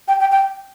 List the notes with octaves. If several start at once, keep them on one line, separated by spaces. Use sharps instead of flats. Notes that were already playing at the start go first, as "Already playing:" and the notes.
G5
G5
G5